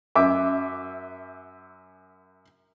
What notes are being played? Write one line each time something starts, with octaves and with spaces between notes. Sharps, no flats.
F#2 E5 D6